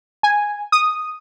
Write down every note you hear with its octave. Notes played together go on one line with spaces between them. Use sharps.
G#5
D#6